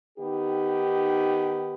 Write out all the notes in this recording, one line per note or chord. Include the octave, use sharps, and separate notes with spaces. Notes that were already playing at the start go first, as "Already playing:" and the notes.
D#3 B3 D#4 G4